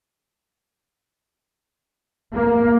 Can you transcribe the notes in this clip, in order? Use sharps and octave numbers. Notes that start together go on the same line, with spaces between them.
A#3